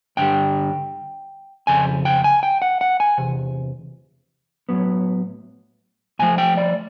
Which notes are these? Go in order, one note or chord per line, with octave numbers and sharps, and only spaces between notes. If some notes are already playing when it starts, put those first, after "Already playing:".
G2 D3 G3 G5
F2 C#3 G#5
G5
G#5
G5
F#5
F#5
G#5
E2 C3
A2 F#3 B3
A2 F3 A3 G#5
G5
D5